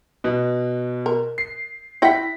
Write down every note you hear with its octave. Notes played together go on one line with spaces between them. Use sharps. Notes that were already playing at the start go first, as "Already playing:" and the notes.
B2
A#4
C7
E4 F#5 G5 A#6 B6